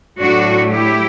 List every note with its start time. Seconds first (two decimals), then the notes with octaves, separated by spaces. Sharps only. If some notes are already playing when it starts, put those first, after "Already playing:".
0.19 A2 F#3 A3 D4 F#4
0.70 E4 G4